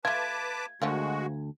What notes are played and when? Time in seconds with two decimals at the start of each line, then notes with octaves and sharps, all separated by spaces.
0.05 A3 F4 B4 A5 D6 G#6
0.82 D2 D3 F3 G#3 A#3 F#4